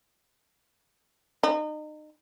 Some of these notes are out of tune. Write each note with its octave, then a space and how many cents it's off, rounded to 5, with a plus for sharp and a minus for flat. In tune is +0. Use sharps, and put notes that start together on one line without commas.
D#4 -30